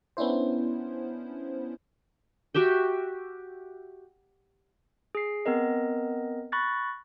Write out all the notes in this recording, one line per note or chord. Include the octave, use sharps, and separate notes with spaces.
B3 C#4 D4 E4 C5
F#4 G4 E5 G5
G#4 C7
B3 C4 A#4 D#5
B5 C#6 F#6 A6 A#6